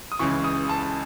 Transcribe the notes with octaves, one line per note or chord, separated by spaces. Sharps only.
D#6
C#2 C#3 E3 C#6
D#6
A5